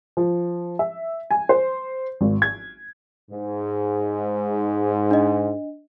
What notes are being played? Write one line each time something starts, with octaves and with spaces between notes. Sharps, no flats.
F3
E5
G#5
C5
G#1
G#6
G#2
D4 D#5